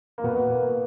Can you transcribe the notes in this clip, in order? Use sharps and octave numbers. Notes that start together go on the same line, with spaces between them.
A#3
B2 B3
A#3